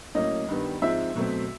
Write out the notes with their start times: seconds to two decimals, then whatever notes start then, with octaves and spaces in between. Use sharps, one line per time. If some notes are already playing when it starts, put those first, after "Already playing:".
0.15 A2 F#3 A#3 C#4 D#5
0.48 G2 D#3 G3 B3
0.82 G#2 F3 G#3 C4 E5
1.16 B2 F#3 A3 C4